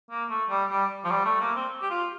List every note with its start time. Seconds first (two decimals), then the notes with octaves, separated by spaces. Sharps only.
0.10 A#3
0.30 A3
0.50 G3
0.71 G3
1.05 F3
1.11 G3
1.25 A3
1.40 A#3
1.56 C4
1.82 G4
1.90 F4